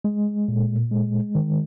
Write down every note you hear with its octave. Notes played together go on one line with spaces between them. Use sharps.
G#3
A#2
G#3
D#3